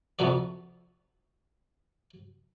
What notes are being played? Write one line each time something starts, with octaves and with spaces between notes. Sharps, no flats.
F2 C3 F3 F#4 D5